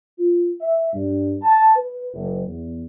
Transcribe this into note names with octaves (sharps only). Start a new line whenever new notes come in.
F4
E5
G2
A5
B4
F#1
E2